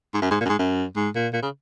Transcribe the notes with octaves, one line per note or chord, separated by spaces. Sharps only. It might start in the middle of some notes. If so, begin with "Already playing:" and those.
G#2
F#2
G#2
A#2
F#2
G#2
F#2
G#2
A#2
A#2
C#3